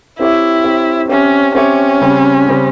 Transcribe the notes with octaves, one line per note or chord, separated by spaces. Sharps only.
C4 E4 G4 C#5 E5
C4 G4 C#5 E5
C4 C#4 G4 C#5 E5
C4 C#4 G4 C#5 E5
C#3 G3 C4
C#3 G3 C4